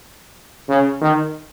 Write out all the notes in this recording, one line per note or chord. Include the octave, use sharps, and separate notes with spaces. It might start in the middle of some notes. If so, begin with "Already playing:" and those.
C#3
D#3